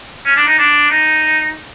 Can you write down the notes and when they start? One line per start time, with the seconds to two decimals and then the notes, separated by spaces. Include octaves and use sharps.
0.25 C#4
0.37 D4
0.47 D#4
0.59 D4
0.90 D#4